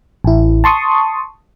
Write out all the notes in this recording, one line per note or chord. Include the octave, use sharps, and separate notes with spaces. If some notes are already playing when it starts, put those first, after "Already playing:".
A1 E4
A5 C6 C#6 D#6